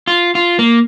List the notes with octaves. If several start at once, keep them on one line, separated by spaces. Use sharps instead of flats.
F4
F4
A#3